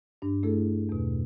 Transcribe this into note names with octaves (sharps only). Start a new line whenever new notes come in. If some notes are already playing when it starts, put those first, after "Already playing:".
G2 D4
A3 E4 G#4 A4
E2 B2